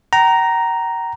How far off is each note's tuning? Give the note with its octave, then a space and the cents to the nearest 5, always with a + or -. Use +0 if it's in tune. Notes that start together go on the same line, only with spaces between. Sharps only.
G5 -45 A#5 +0